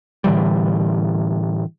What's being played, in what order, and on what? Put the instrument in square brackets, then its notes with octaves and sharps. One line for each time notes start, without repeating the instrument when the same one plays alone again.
[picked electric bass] A2 D3 E3 G3